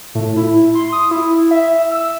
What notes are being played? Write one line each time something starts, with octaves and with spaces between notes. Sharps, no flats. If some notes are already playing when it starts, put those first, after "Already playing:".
A2
E4
C6
D#6
E4
E5
E6